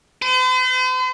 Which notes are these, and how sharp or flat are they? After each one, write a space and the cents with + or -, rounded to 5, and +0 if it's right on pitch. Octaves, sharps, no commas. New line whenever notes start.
C5 -45